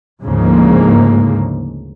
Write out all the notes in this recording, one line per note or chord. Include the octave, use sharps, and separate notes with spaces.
D2 G#2 C#3 F3 A#3